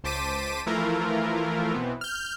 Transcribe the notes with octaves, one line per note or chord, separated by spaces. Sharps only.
C#2 C5 A5 D6 B6 D#7
E3 F3 A3 E4 F4 A#4
B2 E3 B3 C4
F6 G6